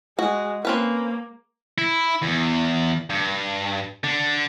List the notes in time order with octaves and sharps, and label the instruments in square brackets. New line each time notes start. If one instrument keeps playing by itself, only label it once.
[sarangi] G#3 [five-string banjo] F#4
[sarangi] A#3 [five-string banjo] C4 C#4 B4
[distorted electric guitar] E4
E2
G2
D3